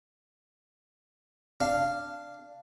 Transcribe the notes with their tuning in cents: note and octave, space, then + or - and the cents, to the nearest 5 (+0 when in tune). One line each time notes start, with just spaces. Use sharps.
D4 +0 F5 -10